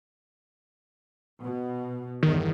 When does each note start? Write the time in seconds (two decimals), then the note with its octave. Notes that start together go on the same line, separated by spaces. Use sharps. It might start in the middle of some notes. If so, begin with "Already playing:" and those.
1.41 B2
2.23 G1 E2 D#3